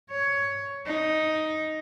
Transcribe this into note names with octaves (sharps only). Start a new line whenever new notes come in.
C#5
D#4